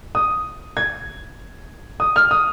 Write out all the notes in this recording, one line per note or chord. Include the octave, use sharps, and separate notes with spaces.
D#6
G#6
D#6
F6
D#6